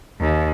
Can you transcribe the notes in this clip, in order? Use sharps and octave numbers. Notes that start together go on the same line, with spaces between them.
D#2